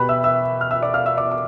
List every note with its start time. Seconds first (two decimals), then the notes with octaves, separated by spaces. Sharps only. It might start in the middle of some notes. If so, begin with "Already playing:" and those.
Already playing: B2 G4 B4 B5
0.09 E5 E6
0.24 E5 E6
0.61 F6
0.71 E5 E6
0.83 D5 D6
0.94 F5 F6
1.06 E5 E6
1.17 D5 D6
1.32 D6